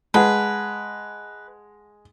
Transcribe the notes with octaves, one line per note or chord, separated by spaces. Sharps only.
G#3 B4 F#5 A5